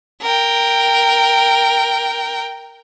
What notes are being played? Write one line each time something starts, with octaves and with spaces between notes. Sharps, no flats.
A#4 G5